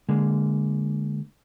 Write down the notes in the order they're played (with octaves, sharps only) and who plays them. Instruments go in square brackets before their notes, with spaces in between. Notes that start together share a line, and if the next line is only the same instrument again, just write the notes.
[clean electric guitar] D3 G#3 A#3